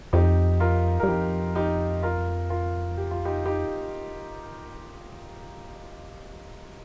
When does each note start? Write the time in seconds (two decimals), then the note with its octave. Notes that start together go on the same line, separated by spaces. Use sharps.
0.13 F2 D#4 G4
0.60 F4 A#4
1.00 G2 A#4
1.08 F2 D#4 G4
1.55 D#4 G4
2.03 F4 A#4
2.50 F4 A#4
2.97 G4
3.11 F4
3.25 D#4 G4
3.46 D#4 G4